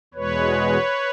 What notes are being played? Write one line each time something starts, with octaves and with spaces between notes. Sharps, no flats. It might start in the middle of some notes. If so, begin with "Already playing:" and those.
E2 B2 G#3 B4 C#5